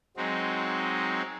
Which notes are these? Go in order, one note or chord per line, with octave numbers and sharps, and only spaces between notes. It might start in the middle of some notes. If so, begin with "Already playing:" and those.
F#3 G#3 C4 D#4